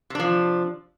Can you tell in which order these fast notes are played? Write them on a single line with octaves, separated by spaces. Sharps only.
C3 D4 F3